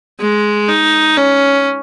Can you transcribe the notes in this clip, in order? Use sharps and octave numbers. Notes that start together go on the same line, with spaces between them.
G#3
D#4
C#4